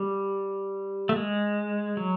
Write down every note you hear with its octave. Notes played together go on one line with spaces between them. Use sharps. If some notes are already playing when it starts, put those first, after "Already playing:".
Already playing: G3
A3
G#3
F#3